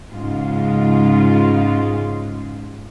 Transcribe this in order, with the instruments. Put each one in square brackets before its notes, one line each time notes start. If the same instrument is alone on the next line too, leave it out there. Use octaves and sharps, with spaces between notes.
[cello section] G#2 C#3 G#3 F4